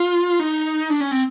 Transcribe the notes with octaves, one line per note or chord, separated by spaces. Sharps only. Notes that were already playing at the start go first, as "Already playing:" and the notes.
Already playing: F4
D#4
D4
C#4
C4